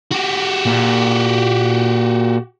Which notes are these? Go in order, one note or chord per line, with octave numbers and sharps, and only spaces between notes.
F#4 G4
A#2